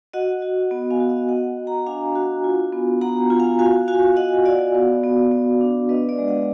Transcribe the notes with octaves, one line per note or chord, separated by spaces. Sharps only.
F#4 D#5 F#5
F#4
B3
F5 G#5
F#4
D#5 F#5
F#4 D#5 F#5
F#4
F#5 A#5
D4 F5 G#5
F#4
F4
B3
B3 F#5 A#5
F4
F5 G#5
F#4 F5 G#5
F#4 F5 G#5
F#4 D#5 F#5
F#4 D5 F5
B3
B3
B3
D4
D4 B4 D#5
D5 F5
G#3
D#5 F#5